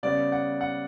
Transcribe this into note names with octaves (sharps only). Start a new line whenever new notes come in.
C#3 G3 B3 D5
F#5
F#5